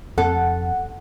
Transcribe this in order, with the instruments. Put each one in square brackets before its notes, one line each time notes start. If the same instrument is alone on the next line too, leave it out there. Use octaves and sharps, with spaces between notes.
[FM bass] F2 [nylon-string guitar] A4 [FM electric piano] F#5